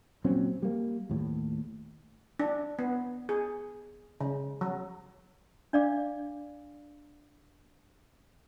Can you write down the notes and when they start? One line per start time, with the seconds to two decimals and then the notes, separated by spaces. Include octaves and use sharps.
0.24 A#2 F#3 C4 C#4
0.62 G3 A#3
1.10 D#2 A2
2.39 D4
2.79 B3
3.29 G#4
4.20 C#3
4.61 F#3
5.73 D4 D5 F5 D6